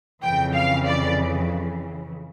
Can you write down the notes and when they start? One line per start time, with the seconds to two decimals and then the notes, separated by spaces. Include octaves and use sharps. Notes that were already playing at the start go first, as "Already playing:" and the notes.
0.23 F2 C#3 E3 G5
0.54 F5
0.86 D5